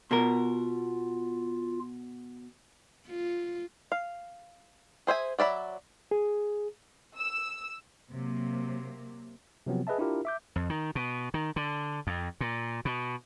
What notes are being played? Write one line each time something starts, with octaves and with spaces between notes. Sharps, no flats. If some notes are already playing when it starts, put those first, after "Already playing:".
B2 F4 A#4
F4
F5
G#4 C5 E5 G#5
F#3 D5 E5 B5
G#4
E6
C3 F#3 A#3
C3 F3 F#3 B3 C4
G#4 B4 D#5 E5 A5
D4 E4 F4 G4 A#4
E5 D6 G6
F2
D#3
B2
D#3
D3
F2
A#2
B2